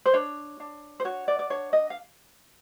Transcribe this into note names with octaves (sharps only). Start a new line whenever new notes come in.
C5
D4 C#5
D4
C5
F#4 C#5
D5
D5
D4 C#5
D#5
F5